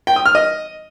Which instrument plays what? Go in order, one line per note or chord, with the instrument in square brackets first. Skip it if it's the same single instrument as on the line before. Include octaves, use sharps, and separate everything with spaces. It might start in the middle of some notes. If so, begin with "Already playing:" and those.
[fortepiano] G5
D#6
F6
D#5